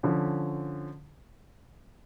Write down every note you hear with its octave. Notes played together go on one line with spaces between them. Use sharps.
D3 F3 C#4